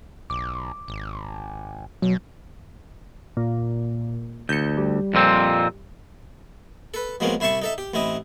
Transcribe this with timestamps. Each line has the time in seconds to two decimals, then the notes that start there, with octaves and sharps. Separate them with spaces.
0.30 B1 D6
0.88 G#1
2.02 B2 F#3
3.37 A#2
4.49 D2 G6 C#7
4.77 G3
5.14 F2 A#2 C4
6.94 A4 B4
7.20 B2 F3 G#3 A#3 C4 C#4
7.40 C2 E4 C5 E5 A5 C#6
7.62 D#4 A4 E5
7.78 G4
7.94 A1 C4 E4 D#5